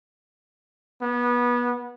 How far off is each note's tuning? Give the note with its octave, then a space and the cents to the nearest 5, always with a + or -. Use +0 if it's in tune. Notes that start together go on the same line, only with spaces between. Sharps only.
B3 -25